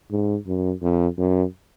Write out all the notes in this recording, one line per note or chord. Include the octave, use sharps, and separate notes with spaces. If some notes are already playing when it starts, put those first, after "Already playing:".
G#2
F#2
F2
F#2